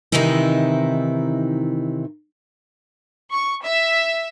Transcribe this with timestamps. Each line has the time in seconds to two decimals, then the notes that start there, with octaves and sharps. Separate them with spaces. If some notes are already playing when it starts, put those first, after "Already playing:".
0.12 C3 D#3 E3 C4 D#4 E4
3.33 C#6
3.64 E5